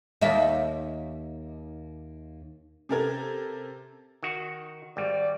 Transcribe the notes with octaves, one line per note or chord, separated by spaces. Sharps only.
D#2 D#4 E5
C3 A4 A#4 G#6
D#3 F#4
G#1 G3 D5